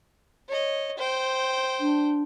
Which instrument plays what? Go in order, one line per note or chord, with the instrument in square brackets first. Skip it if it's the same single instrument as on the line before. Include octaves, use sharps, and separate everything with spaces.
[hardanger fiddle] C#5 D#5
C5 G5
[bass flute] D4